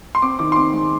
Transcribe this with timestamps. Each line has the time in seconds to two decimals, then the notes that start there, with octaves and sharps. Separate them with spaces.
0.15 C6
0.22 C4 D6
0.39 D#3 D6
0.52 C6
0.56 C4 D6
0.73 G#3